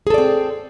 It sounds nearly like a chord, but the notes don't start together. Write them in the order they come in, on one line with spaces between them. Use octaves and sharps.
G#4 A4 D5 C4